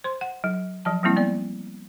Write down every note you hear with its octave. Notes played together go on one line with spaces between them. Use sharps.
C5 C6
F#5
F#3
F3 F#3 A5
F3 G3 A#3 C4 E4
B3 D5